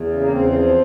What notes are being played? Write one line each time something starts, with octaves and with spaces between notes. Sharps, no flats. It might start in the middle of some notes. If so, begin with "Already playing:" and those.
Already playing: E2
C#3
A#3
E2 C4
F3